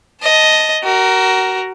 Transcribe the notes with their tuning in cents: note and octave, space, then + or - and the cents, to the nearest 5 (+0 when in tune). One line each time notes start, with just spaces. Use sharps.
D#5 +5 A5 +0
F#4 +30 A#4 +0